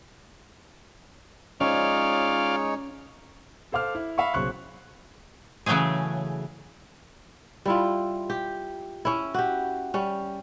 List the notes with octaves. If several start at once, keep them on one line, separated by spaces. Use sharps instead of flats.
G#3 C#4 D#4 F4 C#5 D5 F5
A4 C5 F5 D6 F6
E4
E5 F5 B5 C#6
B1 C#3 C5 C#6 F#6
C#3 E3 F#3 A3 G#4
G3 E4 F4
G4
C#4 E4
F#4 G4
G3 C#4